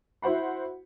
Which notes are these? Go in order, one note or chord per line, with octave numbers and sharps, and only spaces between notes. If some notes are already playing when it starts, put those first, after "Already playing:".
E4 F#4 C5 F#5 B5